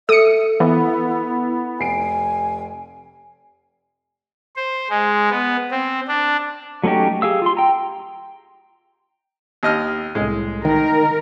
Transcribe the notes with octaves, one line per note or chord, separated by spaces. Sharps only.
A4 E5 D#6 C#7
E3 B3 E4
F1 G#5 C7 D7
C5
G#3
B3
C4
D4
F#3 A3 C#4 D#4 G4
G4 G#4 F5 E6
F4 C6
G5 A#5
D#2 D#5 F6
C2 A2 G#3
D#3 A#4